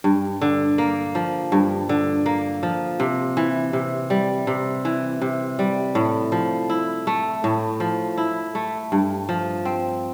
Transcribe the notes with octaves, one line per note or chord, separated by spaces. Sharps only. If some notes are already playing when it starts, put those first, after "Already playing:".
G2
D3
A#3
F3
G2
D3
A#3
F3
C3
E3
C3
G3
C3
E3
C3
G3
A2
F3
E4
A3
A2
F3
E4
A3
G2
F3
C4